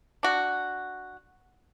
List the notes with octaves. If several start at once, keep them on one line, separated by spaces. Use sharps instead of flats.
D4 F#4